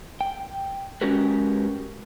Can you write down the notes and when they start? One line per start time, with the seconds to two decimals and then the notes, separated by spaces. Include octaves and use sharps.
0.21 G5
1.01 G#3 C#4 F#4 G4 A#4 B4